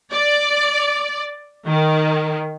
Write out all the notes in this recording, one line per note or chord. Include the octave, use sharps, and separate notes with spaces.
D5
D#3